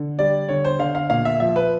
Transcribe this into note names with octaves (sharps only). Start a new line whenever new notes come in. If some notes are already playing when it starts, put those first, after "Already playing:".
Already playing: D3
G3 D5
D3 C#5
C5
D3 F5
F5
A#2 F5
E5
F3 E5
B4